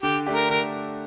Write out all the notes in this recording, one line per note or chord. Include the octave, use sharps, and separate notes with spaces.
D3 G4
A3 D4 G4
A#4
D3 A#4